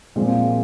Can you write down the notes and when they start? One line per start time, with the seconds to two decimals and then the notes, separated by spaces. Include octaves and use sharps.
0.16 A#2 F3 G#3 C4 F4